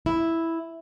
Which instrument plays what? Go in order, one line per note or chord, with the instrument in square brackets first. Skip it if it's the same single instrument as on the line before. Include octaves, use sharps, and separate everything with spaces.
[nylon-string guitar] E4